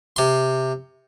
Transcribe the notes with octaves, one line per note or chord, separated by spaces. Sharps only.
C3 C6